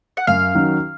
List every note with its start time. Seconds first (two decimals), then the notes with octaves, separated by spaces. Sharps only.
0.17 F#5
0.27 F#2 F5
0.55 D#3 F#3 C#4